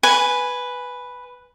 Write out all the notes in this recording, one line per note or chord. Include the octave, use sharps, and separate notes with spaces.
B4 G#5